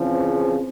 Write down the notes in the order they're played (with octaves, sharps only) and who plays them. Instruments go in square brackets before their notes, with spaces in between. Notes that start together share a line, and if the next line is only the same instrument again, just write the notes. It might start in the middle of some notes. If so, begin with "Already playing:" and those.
Already playing: [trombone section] E2 C#3 F3 [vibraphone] C4 C5